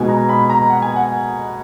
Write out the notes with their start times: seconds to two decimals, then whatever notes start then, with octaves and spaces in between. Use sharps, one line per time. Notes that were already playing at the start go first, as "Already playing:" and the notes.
Already playing: B2 G#3 B3 D#4 G#5
0.08 A#5
0.29 B5
0.49 A#5
0.70 F#5
0.82 G#5
0.96 F#5